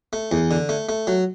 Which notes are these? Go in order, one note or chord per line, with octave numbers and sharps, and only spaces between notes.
A3
E2
D3
A3
A3
F#3